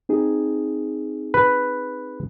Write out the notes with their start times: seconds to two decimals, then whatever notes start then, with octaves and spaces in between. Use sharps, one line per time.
0.09 C4 D#4 G#4
1.34 B4